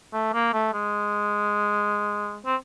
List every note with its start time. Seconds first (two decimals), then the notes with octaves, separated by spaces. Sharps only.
0.13 A3
0.33 A#3
0.53 A3
0.74 G#3
2.46 C4